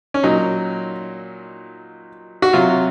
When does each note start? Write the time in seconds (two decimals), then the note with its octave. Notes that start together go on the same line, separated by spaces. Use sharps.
0.14 C#4
0.23 A#2 F#3 D#4
2.42 F#4
2.53 C3 F#3 F4